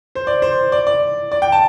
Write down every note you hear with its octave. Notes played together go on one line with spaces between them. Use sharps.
C5
D5
C5
D5
D5
D5
G5
A5